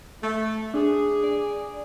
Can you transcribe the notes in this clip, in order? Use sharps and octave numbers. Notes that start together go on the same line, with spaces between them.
A3
D4 G#4
D5